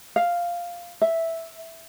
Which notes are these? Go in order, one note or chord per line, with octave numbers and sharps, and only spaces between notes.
F5
E5